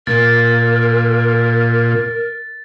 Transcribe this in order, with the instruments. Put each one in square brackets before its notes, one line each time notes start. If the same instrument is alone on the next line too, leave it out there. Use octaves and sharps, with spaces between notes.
[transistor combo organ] A#2 [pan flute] A#4 [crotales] A6